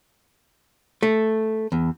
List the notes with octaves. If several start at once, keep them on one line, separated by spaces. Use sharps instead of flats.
A3
E2